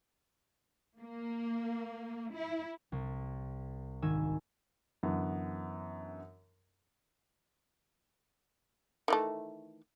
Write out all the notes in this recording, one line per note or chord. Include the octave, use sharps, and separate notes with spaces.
A#3
E4
C2
G#1 D#3 G#5 E6
F#2 D3 E3 B3
D#3 E3 A3